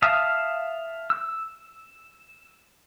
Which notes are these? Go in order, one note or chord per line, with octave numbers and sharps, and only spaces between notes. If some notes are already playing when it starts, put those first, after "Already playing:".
E5 F5 A5 D#6
E6